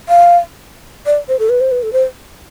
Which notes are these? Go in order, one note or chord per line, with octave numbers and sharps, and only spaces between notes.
F5
D5
C5
A4
B4
C5
B4
A4
C5